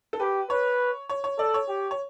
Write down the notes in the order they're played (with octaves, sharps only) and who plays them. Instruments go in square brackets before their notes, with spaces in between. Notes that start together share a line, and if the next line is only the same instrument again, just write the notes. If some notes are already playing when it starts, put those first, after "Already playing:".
[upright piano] A4
[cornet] G4 [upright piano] B4
[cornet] B4 [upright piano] C#5
[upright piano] C#5
C#5
[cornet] A4 [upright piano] D5
[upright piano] C#5
[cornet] G4
[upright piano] C#5